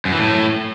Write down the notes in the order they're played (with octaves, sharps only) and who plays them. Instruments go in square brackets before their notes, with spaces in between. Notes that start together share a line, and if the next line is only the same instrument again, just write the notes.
[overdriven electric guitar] F#2
E3
A2